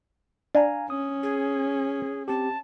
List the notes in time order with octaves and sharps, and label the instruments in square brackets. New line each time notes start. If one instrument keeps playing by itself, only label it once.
[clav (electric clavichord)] D4 [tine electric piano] F5 G#5 A#5
[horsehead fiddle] C#4 [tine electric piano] D#6
[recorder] G#4
[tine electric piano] C4 G4 [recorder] A5